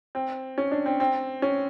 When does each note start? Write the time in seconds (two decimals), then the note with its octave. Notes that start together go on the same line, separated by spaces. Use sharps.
0.15 C4
0.58 C#4
0.71 D4
0.86 C4
1.00 C4
1.42 C#4